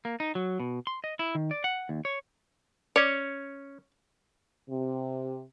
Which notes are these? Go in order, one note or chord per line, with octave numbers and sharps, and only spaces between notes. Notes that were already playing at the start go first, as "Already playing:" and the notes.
A#3
D#4
F#3
B2
C6
D#5
E4
D#3
D5
F#5
D#2
C#5
C#4 C#5 D5
C3